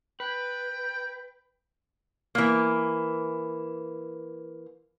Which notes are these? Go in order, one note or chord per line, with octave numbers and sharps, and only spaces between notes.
B4 G5
E3 A#3